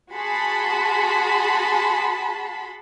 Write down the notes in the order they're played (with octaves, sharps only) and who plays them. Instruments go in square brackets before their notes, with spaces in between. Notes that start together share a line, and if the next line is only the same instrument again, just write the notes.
[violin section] F#4 G#4 A5 B5 C6